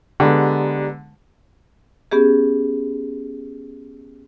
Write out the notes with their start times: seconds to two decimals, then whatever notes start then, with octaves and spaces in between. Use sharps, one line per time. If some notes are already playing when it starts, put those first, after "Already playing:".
0.20 D3 G#3 B3 G4 D5 A#5
2.11 B3 C#4 G4 G#4